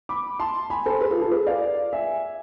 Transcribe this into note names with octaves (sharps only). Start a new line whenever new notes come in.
B5 D6
A5 C6
G#5 B5
A4 C5
G#4 B4
F4 A4
F4 A4
G#4 B4
D5 F5
E5 G#5